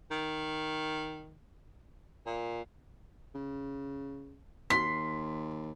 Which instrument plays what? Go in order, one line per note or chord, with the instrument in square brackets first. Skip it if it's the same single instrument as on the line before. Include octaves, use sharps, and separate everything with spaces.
[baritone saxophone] D#3
A#2
[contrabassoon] C#3
[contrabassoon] D#2 [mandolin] C6 [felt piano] B6